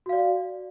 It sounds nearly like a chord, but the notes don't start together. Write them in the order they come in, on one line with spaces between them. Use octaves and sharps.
F#4 F5 D5